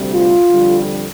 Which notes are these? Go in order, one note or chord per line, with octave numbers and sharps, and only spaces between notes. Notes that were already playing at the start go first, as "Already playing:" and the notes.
Already playing: D2 C3 G3
F4
F2 D3 G3